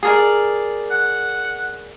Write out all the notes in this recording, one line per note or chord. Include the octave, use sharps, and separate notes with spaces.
G#4 A#4 D5
F#5